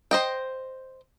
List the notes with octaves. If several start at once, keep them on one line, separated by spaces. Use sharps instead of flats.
C5 D#5 G5